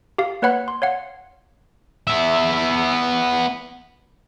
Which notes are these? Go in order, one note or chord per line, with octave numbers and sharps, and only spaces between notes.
G4 F5
A#3 B4 C#5 F#5 B5 F#6
C6
C#5 F5 F#5
B3 E5